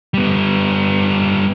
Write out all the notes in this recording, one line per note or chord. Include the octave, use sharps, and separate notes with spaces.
G3 B3